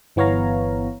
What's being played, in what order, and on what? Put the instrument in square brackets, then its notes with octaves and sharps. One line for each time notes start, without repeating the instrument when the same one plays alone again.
[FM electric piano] G1 E3 B3 C#5 F5 A#5